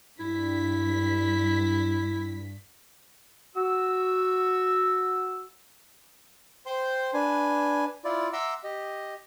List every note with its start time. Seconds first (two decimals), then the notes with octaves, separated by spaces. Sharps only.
0.20 G2 E4 B6
3.56 F#4 E6
6.66 C5 G5 C6
7.14 D4 B4 G#5
8.05 E4 F4 D5
8.33 E5 F#5 A#5 C6 D6 E6
8.64 G4 D#5